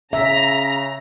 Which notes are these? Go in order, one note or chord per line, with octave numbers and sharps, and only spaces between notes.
C#3 E5 A#5